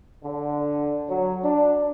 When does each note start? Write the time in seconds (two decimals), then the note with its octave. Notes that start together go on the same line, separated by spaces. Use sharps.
0.24 D3
1.09 F#3
1.42 D4